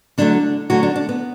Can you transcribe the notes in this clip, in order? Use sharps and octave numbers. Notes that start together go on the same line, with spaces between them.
D3 F#3 A3 D4
D3 F#3 A3 F#4
D4
D4
B3